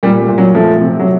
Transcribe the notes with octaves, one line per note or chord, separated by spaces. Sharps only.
A#2 G3
G3
A#2
F#3
F3 A3
C3
F#3